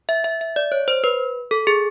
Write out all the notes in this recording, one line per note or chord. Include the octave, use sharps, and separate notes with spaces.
E5
E5
E5
D5
C#5
C5
B4
A4
G#4